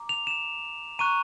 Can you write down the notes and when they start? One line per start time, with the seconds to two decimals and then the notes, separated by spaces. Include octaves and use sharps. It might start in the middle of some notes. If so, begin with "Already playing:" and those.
Already playing: A#5 D6
0.09 F7
0.27 E7
0.99 A#5 C#6 F#6 D#7